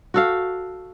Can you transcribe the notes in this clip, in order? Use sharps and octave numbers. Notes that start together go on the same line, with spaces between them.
F#4 A4 F5